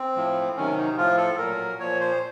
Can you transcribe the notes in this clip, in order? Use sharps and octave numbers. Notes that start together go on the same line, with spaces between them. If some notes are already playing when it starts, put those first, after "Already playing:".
Already playing: C4
A2 F3
C3 D#3 F#3 C#4
D#4
A2 F3 F4
A4
A#2 F#3 A#4
A#2 F3 C#5
C5